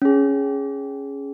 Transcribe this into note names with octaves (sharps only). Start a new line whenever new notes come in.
C#4 G#4